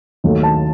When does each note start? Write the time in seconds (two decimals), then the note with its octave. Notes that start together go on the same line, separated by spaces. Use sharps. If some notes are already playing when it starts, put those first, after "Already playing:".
0.24 D#2 D#3 F#3 A3
0.43 A5